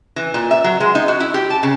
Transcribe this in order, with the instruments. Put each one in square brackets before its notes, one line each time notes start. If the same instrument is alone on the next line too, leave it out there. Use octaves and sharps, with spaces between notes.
[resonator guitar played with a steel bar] E3
A#2
E5
F#3
G#3
D#4
F#4
E4
G4
A5
C#3